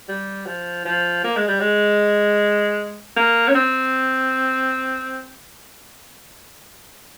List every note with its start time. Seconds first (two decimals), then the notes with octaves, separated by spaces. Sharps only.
0.08 G3
0.46 F3
0.85 F3
1.24 A#3
1.36 G#3
1.48 G3
1.60 G#3
3.16 A#3
3.48 C#4
3.55 C4